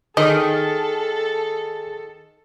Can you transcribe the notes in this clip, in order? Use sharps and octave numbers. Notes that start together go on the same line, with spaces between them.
D#3 G#4 A4 D#5